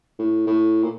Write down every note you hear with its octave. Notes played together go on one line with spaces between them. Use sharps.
A2
A2
A#2